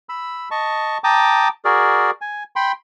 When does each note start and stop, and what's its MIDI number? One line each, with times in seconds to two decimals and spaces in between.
0.09 0.49 83
0.09 0.49 88
0.51 0.98 75
0.51 0.98 81
0.51 0.98 85
1.04 1.48 79
1.04 1.48 81
1.04 1.48 82
1.04 1.48 86
1.04 1.48 87
1.65 2.11 66
1.65 2.11 68
1.65 2.11 70
1.65 2.11 74
2.21 2.43 80
2.56 2.72 79
2.56 2.72 83
2.56 2.72 84